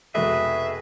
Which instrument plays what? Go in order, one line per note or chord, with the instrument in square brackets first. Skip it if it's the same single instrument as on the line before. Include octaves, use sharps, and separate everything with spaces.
[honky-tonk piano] F1 B2 G#3 [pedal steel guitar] G#4 B4 D#5 [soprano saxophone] E5